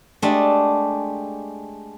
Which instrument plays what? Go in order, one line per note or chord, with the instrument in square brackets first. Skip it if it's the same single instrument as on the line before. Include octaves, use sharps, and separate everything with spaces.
[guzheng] G#3 A3 D4 G4